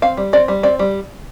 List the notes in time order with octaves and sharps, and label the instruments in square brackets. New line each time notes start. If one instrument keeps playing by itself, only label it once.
[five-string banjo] C4 F5
G3
C4 D5
G3
C4 D5
G3